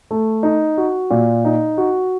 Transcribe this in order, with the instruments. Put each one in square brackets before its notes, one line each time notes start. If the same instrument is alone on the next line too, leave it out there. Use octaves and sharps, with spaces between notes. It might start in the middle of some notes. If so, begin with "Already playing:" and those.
[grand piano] A3
D#4
F#4
A#2
D#4
F#4